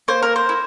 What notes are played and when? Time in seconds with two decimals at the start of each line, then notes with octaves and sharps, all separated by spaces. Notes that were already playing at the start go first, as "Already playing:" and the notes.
0.08 A#3 C5
0.22 A#4
0.36 C5
0.49 E4